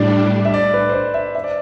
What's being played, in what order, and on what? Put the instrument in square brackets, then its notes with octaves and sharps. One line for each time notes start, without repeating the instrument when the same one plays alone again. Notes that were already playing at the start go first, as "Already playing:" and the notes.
Already playing: [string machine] A2 G3 D4 [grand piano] D5
[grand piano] E5
D5
B4
C5
D5
E5
E5
D5